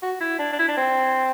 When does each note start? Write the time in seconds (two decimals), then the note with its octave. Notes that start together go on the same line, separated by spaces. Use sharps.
0.03 F#4
0.21 E4
0.39 D4
0.52 D4
0.59 E4
0.68 D4
0.77 C4